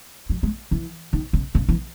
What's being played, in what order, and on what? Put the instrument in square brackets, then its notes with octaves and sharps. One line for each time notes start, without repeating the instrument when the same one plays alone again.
[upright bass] F#3
G#3
E3
D#3
C#3
C#3
E3